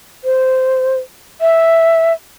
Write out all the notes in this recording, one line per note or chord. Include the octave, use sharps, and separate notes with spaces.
C5
E5